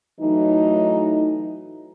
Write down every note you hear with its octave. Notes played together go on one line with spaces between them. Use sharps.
A2 E3 F#3 A3 D#4